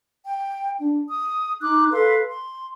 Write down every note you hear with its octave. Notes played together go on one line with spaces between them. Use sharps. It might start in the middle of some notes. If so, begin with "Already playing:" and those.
G5
D4
D#6
D#4 D6 F#6
A4 B4 F5 C6
C6